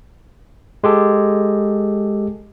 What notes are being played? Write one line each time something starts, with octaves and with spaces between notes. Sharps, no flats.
G#3 G4 A4